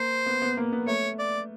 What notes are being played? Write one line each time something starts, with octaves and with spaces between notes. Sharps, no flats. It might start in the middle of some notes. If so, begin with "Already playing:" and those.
Already playing: A#3 C5
B3
B3
A#3
B3
A3 C#5
D5